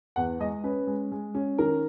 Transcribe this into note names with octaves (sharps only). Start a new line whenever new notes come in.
E2 F#5
G#3 D#5
C#4 B4
G#3
G#3
C#4
D#3 A#4